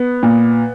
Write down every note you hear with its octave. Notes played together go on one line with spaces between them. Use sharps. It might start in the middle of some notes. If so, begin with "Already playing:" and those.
Already playing: B3
A#2